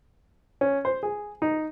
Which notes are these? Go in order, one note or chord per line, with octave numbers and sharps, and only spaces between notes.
C#4
C5
G#4
D#4